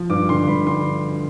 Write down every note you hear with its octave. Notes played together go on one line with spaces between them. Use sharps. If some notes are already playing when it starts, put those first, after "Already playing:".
Already playing: F3
G2 D6
D3 C6
G2 B5
D3 C6